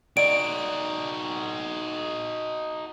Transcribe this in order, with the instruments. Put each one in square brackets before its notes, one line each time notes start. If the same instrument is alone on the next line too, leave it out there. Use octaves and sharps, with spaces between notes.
[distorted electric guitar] D#4 F#4 [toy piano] D5 D#5 [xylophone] D7